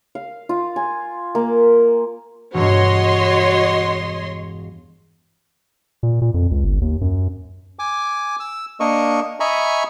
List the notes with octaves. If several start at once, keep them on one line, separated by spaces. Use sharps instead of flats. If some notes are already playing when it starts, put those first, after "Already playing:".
F5
F4
G#5
A#3
E1 G2 F#4 C#5 D#5 C6
A#2
A#2
F2
C#2
G1
D#2
F#2
G#5 D6
E6
A#3 D4 A#4 D#5 C#6
D#5 E5 G#5 A#5 B5 C#6